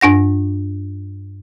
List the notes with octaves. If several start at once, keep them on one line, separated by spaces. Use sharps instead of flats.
G2 D4 F#5 A#6